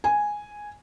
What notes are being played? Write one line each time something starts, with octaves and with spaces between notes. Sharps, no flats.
G#5